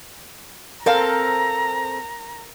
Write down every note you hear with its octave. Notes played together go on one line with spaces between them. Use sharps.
C4 A4 A#4 F5 A#5